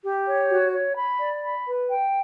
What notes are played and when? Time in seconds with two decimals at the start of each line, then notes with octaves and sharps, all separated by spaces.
0.03 G4
0.27 C#5
0.49 F#4
0.73 C#5
0.96 B5
1.21 D5
1.43 B5
1.68 B4
1.90 G5